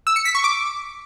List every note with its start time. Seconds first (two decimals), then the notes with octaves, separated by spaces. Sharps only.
0.07 E6
0.16 C#7
0.25 B6
0.35 C#6
0.44 D6